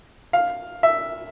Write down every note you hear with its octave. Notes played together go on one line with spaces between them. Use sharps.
F5
E5